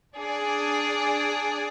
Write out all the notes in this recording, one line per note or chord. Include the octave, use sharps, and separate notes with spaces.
D4 G#4 D5